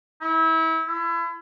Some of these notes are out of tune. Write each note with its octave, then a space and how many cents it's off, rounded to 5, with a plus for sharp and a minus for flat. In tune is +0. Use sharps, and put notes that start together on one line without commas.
E4 -30
E4 +30